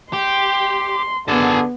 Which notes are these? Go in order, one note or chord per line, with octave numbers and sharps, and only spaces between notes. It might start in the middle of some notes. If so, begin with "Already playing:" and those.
G4 C6
D3 B3 G#4 A5